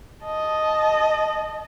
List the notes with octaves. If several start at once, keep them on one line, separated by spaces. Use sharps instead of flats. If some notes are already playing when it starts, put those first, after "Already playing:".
D#5 A5